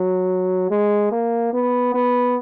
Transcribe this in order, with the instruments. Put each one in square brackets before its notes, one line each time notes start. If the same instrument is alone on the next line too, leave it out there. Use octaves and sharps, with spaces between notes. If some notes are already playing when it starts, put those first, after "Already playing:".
Already playing: [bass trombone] F#3
G#3
A#3
B3
B3